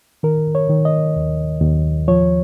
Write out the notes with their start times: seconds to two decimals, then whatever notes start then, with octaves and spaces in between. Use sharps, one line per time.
0.23 D#3 A#4
0.55 C#5
0.70 D#3
0.85 D#5
1.16 D#2
1.61 D#2
2.08 F3 C#5